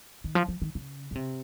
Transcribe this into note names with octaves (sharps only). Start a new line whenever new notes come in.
D#3
F3
F3
D#3
C#3
C#3
C3